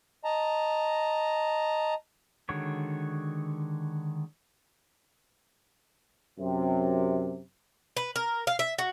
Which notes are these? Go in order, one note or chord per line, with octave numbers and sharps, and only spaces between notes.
D#5 A5 A#5
D3 D#3 G#3 F#4 C#5
F#2 C3
B4
A#4
F5
E5
F#4